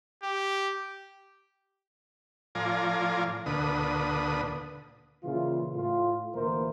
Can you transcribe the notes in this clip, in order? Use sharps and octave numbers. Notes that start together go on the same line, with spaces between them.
G4
A2 F3 F4 D5 G#5 A#5
D2 A#2 D3 B4 D#6
A#2 C#3 E3 F4
A2 F4
D2 A#2 E3 A#3 A#4 C5